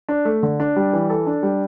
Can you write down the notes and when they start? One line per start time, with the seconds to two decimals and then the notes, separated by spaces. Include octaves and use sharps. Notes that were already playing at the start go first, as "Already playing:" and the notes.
0.09 D4
0.25 A3
0.43 D3
0.60 D4
0.76 G3
0.93 E3
1.10 A4
1.27 D4
1.43 G3